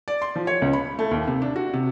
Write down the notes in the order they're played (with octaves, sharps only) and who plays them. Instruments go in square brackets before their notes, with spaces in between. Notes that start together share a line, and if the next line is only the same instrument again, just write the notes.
[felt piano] D5
C6
F3
C#5
C#2
B5
A3
D#2
C3
D4
F#4
C3